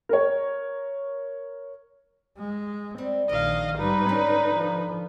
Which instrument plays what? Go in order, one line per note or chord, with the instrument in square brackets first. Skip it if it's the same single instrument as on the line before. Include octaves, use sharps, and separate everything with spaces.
[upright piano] A#4 C#5
[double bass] G#3
[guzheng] G3 [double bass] C4
[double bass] A#1 D#3 [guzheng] A#4 [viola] D#5 F5
[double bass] G#2 G3 [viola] D#4 B4
[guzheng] D3 [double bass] C#4
[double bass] F3